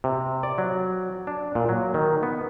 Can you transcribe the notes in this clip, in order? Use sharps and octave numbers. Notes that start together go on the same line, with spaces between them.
C3
D5
F#3
D4
A#2
F#3
D#3
B3